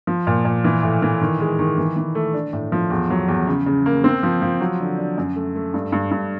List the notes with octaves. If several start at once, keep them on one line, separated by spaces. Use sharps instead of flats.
F3
A#2
A#2
E3
A2
E3
D#3
G#3
D#3
E3
E3
A3
D4
A2
F3
E2
F#3
E2
C#3
C#3
A#3
C4
F3
F3
F#3
D3
D4
F#2
A3
A3
G2
G2
G2